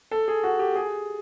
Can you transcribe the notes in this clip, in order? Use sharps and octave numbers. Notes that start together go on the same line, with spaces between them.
A4
G#4
F#4
G4
G#4